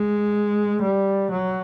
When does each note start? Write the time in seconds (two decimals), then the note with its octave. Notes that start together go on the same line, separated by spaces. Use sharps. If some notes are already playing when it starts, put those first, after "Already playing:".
Already playing: G#3
0.82 G3
1.31 F#3